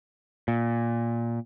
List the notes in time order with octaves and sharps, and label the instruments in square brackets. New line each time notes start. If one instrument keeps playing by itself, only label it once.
[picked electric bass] A#2